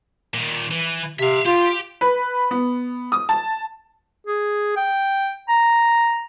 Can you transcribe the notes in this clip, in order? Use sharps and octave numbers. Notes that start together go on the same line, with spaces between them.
A#2 D#3
E3
C3 E5 F5
F4 G4
B4
B3
D#6
A5
G#4
G5
A#5